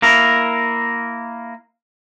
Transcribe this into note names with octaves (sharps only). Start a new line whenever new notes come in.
A#3 E4 A#4